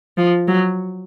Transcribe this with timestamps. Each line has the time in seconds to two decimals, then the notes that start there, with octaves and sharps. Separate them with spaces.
0.18 F3
0.48 F#3